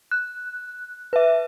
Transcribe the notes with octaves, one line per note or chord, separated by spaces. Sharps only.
F#6
B4 E5